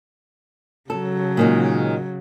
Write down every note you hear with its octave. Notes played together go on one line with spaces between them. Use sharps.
C#3 F#3 A4
A#2 D#3 G#3